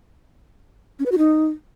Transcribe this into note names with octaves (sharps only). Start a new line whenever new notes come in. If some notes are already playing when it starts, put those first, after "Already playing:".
C#4
B4
F#4
D#4